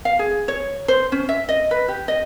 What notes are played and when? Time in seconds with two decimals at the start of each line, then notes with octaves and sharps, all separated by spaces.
0.05 F5
0.19 G#4
0.48 C#5
0.88 C5
1.12 C#4
1.29 E5
1.49 D#5
1.71 B4
1.88 G4
2.08 D#5